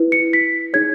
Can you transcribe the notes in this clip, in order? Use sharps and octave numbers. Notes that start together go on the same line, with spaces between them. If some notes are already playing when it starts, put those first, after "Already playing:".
Already playing: E4 B4
C#7
B6
D#4 G#4 C#5 G#6